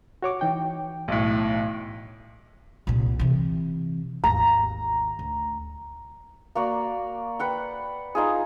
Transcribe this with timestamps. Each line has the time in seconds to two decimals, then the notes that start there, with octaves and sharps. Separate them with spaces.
0.22 F#4 C#5 D6
0.41 E3 D#4 G5
1.08 B1 A2
2.87 C2 A#2
3.19 C3 E3
4.24 G#1 D#2 A#5
5.19 D2
6.55 A#3 F#4 D5
7.39 B4 F#5 G5
8.15 D#4 F4 G#4